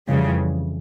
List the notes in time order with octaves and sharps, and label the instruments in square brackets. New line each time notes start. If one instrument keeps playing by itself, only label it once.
[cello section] F2 C#3 E3 G3